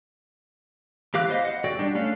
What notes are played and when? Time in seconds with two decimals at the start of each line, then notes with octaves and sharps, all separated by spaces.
1.14 E3 G4 F5 D6 F#6
1.29 B3 C5 D#5 F5
1.45 D#5 F#5
1.64 F#4 A4 D5 G5
1.79 G3 D4 F#4 G4
1.95 A3 C#4 D4 A4 F5